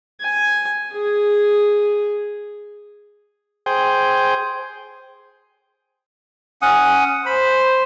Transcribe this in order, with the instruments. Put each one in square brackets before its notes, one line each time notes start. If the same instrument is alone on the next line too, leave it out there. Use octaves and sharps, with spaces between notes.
[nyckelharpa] G#5
G#4
[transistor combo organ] G#4 C5 G5
[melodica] C#4 F#5 D#6
[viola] C5 [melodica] B5